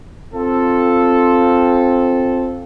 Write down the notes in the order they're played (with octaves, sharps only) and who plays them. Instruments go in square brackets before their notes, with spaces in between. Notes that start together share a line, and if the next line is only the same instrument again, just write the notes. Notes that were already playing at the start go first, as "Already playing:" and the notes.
[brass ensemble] C4 F4 A4